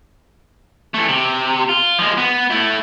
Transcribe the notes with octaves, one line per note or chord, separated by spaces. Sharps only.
E3 A3
C3
F4
F3 G#3
B3
A3 E4